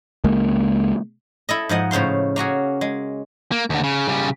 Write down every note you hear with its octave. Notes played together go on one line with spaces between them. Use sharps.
C#2 G#3 A#3
E4 A4 D#5
G#2 F3 D#5 F#5
A2 C#3 C5 F5 C6
A#3 C#4 F#4 G#4
G#3
A#3
D#2 D3
C#3
C#3 G3